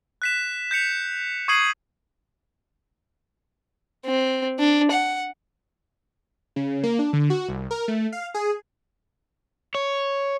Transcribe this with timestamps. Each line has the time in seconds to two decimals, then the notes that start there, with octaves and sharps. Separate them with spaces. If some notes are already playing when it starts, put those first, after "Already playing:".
0.22 F#6 B6 E7
0.71 G6 B6 C#7 F7
1.48 C#6 D#6 G#6 C7 D#7 F#7
4.05 C4
4.59 D4
4.91 F#5
6.56 C#3
6.83 A#3
6.99 D4
7.13 D3
7.30 F#4
7.48 C2
7.71 A#4
7.88 A3
8.12 F5
8.34 G#4
9.75 C#5